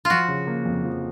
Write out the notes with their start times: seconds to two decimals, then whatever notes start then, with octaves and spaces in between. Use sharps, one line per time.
0.05 F4
0.10 F3 F#4
0.28 C#3
0.47 A#3
0.66 F2
0.85 F3